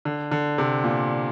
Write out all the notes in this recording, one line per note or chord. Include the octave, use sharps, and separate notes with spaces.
D3
D3
C3
A#2